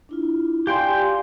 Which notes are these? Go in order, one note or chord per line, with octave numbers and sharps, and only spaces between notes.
D4 E4 F4
G4 D5 F5 G5 G#5 C6